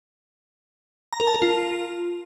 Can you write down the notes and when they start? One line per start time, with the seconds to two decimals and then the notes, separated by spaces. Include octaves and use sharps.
1.13 A#5
1.20 A#4
1.27 A5
1.35 A#4
1.42 F4